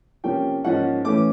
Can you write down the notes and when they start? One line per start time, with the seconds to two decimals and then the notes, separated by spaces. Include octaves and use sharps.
0.24 C3 F3 A#3 C#4 G5
0.64 G#2 F3 A#3 C#4 F#5
1.05 A2 E3 A3 C#4 D6